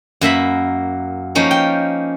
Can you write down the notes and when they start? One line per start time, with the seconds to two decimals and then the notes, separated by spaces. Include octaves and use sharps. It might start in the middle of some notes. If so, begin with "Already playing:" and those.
0.21 F#2 A#3 E5 B5
1.35 F3 A#3 C#4 D#4
1.51 G5